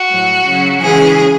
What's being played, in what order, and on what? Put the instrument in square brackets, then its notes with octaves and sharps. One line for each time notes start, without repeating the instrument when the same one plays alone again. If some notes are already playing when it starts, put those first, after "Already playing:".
Already playing: [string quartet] F#4
A2 F#3
C#3 F#3
C#3 E3 G#3 G#4